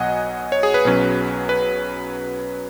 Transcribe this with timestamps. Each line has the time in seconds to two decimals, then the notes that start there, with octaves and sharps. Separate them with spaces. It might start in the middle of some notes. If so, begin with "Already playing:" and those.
Already playing: B1 B2 F#3 D#5 F#5 G#5
0.52 C#5
0.63 G#4
0.74 B4
0.85 B1 B2 F#3 C#4
1.49 B4